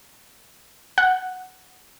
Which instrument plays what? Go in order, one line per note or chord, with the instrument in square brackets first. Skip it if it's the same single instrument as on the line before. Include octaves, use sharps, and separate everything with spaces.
[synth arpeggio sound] F#5